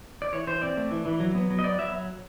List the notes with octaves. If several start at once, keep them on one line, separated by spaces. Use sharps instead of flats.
D5
E3 C#5
E3 C5
C4 D5
A3
E3
E3
F#3
B3
F#3
D#5
B3 D5
F#3 E5